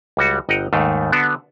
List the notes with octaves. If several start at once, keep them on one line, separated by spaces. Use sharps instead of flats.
C#2 G3 F#4
G1 D#5 F#5 G5 A#5
D#2 G#2 D#3 A3
D3 B3 D4 F#4